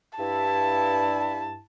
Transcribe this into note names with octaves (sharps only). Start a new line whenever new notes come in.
G2 E4 A5